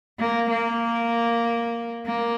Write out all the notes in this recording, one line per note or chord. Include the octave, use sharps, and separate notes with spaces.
A#3
A#3
A#3